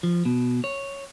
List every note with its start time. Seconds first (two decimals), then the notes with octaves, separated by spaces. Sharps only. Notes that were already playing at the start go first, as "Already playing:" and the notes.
0.03 F3
0.25 B2
0.64 C#5